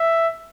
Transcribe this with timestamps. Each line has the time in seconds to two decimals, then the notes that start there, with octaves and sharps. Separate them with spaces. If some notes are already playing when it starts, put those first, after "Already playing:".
Already playing: E5